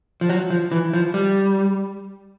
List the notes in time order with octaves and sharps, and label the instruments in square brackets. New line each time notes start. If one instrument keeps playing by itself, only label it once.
[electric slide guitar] F3
F#3
F3
E3
F3
G3